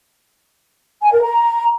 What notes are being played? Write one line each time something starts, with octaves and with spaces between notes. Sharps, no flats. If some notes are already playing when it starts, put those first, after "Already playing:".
G#5
A#4
A#5